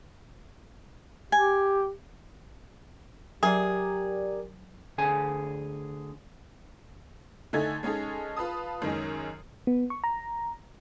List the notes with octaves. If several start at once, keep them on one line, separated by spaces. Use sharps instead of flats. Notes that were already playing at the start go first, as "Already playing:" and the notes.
G4 G#5
F#3 G4 G#4 A#4 D5
D2 D3 G#4 G#5
D3 A3 D#4 G#5 G#6 A6
G#3 C#4 D#4 G#4 A4
F4 B4 A5 D#6
F#2 D#3 G#3 C#4
B3
C#6
A#5